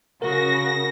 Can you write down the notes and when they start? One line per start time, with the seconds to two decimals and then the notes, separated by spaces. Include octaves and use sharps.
0.22 C#3 F#4 A#4 A#6